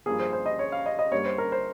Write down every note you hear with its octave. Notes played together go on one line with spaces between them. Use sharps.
G2 F3 A#3 G#4
C5
C5
D#5
C#5
F5
D#5
D#5
G2 G3 A#3 C#5
C5
A#4
C5